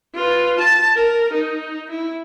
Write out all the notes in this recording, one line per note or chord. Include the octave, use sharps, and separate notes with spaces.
F4 B4
A5
A#4
D#4
E4